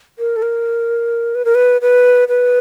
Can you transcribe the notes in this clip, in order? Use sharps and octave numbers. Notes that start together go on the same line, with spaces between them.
A#4
A4
A#4
B4
A#4
B4
B4
B4